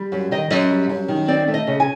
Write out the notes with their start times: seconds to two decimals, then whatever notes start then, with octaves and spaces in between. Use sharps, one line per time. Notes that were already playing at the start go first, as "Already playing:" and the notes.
Already playing: G3
0.12 F#2
0.31 D#3 D#5
0.50 F#2 D#5
0.70 G3
0.89 F#2
1.08 D#3
1.28 C4 D5
1.48 A3
1.54 D#5
1.67 C#3
1.80 G#5